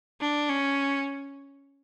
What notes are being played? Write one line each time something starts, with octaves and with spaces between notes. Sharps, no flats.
D4
C#4